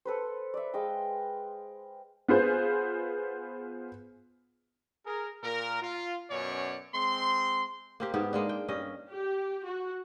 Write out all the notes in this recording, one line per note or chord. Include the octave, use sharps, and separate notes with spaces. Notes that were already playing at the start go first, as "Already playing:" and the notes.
A4 B4 C5
D5 E5
G#3 D#5 F5 G5
B3 F4 G#4 C5
G#4 A#4
A#2 A#4
F4
F#2 B2 C#4 C#5 D5
G#3 C4 C6
A#3 C4 G4
G#2 B3 G4
G#3 A#3 D4
G5
G2 C#4 D#5
G4
F#4